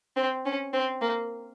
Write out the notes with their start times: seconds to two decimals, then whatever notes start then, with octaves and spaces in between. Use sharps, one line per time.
0.16 C4
0.45 C#4
0.73 C4
1.02 A#3